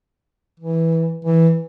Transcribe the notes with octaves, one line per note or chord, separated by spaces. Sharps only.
E3
E3